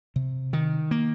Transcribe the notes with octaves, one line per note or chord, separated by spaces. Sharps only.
C3
D#3
A#3